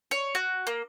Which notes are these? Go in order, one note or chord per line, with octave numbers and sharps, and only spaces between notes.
C#5
F#4
A#3